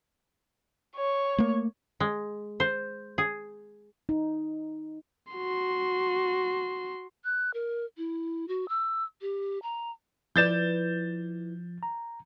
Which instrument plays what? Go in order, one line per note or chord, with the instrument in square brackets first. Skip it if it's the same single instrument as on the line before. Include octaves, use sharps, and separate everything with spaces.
[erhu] C#5
[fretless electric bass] A3 A#3
[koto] G#3
C5
G#4
[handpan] D#4
[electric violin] F#4 C6
[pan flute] F#6
A#4
E4
F#4
E6
G4
A#5
[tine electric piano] F3 [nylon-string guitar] E4 B4 D5 [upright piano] G6 A6 E7
[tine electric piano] A#5